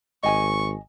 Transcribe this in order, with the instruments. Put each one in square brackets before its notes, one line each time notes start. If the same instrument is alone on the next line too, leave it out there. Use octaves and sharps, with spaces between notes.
[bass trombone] G#1 [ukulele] D#5 G#5 [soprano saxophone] C#6